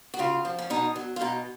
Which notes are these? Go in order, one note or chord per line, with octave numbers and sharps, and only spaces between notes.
F#4
C#3 F4
F3
C#4
B2 D#4
F#3
F4
B2 D#4